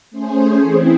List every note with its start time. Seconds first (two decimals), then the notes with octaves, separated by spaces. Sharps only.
0.10 A3 C#4 G#4 C5
0.62 E3 C4 E4 G#4